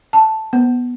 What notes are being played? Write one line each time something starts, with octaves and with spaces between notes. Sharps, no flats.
A5
B3